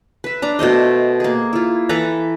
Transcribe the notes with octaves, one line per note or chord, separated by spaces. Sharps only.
B4 E5
D4 A#5
B2 A3 C5 D#5
A#3 G#4
E4 F4
E3 A4 B4 A#5